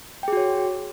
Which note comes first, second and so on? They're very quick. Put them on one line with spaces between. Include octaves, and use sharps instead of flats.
G5 G#4 F#4 C#5